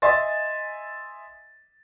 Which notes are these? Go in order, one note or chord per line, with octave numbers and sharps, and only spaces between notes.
D#5 E5 G#5 C6 A6